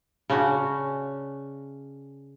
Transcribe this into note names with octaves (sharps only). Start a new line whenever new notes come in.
C#3 C#4 D4 F#4